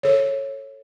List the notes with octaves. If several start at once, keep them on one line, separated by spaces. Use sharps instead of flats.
A4 C#5